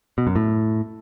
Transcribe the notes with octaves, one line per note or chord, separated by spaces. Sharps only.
B2
F#2
A2